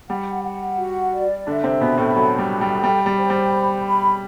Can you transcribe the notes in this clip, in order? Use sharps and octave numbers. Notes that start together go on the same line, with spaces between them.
G3 F#5
F#5
F#4
D5
D3 D4 E5
C3 C4
B2 B3 B5
A2 A3
F#3 A4
G3
A4
G3
G3 G5
G3
C5
G3
B5
B5